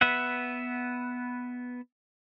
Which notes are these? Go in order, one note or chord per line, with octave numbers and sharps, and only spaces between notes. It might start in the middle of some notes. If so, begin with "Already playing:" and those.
B3 B4 E5 F#5